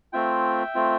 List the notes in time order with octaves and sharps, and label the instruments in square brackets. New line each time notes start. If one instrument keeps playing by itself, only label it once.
[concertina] A3 C4 F4 E5 G5
A3 C4 F4